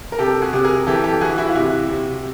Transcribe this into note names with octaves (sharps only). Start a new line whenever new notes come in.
A#4
C3 G4 A4
F#4 G#4
C3
G#4 A#4
E3 G4 A4
G4 A4
E3 F#4 G#4
E4 F#4
F4
C3 E4 F#4
C3